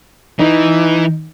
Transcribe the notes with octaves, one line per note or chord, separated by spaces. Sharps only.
E3 D#4